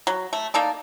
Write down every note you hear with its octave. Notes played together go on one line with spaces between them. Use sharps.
F#3
A3
A#3 D#4 A4 D5